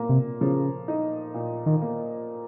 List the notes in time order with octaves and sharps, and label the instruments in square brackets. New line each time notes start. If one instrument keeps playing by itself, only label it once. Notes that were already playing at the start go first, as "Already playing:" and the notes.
Already playing: [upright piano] A#2 A#3
[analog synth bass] C3
[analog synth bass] C#3 [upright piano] F3
[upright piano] D#4
A#2
[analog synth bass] D#3
[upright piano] A#3